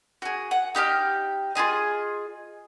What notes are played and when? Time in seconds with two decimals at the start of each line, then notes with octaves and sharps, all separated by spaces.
0.22 F#4 G#4
0.51 F#5
0.75 D#4 G4 G5 F6
1.55 F4 G4 G#4 D#5